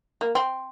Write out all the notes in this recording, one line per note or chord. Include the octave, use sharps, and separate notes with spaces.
A#3
C4